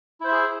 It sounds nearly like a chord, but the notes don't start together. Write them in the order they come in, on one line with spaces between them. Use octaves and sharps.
E4 C5 E5 G#4